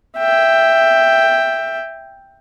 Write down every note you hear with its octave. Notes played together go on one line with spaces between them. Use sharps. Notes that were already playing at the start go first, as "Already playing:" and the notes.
E5 G5